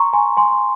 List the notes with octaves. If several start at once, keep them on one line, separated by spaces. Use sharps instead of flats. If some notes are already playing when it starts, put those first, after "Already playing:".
Already playing: A#5 C6 C#6
G#5 C6
G#5 C6